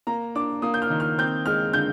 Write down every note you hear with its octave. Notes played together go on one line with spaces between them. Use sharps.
A#3 A#5
D4 D6
A#3 D#6
G6
F6
D#3
F6
C4 G6
G#3 F6
D3 G6